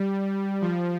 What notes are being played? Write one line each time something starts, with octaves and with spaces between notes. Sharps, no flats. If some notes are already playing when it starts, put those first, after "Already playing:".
Already playing: G3
F3